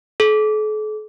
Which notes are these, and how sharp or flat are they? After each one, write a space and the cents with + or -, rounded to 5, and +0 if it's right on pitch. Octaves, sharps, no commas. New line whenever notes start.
A4 -45